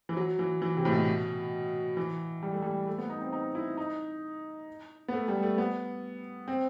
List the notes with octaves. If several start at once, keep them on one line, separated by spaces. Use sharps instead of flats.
E3
F#3
E3
E3
C3
A2
B2
E3
G3
A3
G3
A3
B3
D#4
C4
D#4
E4
D#4
B3
A3
G3
A3
B3
C4